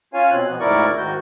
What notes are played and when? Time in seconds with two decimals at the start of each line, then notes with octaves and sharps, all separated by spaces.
0.14 C#4 F4 C#5 F5 G#5
0.31 B2 C4 F#6
0.48 B2 F3 B3
0.60 D2 G#2 E4 A#4 D5 C#6
0.98 G#2 D#3 F#4 G6